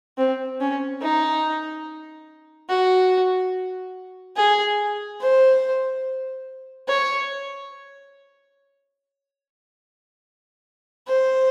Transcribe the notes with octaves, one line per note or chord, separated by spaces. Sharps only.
C4
C#4
D#4
F#4
G#4
C5
C#5
C5